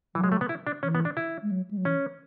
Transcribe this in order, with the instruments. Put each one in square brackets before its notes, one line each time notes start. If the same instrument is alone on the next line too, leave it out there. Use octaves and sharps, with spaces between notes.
[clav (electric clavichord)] E3 [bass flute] F#3
[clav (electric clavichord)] G#3
A3
B3
E4
D4
[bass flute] E3 [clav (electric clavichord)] C#4
[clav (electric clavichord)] B3
D4
E4
[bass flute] G#3
F#3
G#3
F#3
[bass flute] E3 [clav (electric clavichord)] C#4